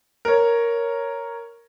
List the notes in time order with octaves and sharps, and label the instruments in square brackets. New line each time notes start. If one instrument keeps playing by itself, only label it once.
[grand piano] A#4 C#5